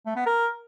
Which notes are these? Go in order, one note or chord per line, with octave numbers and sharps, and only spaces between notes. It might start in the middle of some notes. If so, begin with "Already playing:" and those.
A3
B3
A#4